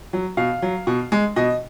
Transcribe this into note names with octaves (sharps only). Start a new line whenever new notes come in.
F#3
B2 F5
F#3
B2
G#3
B2 D#5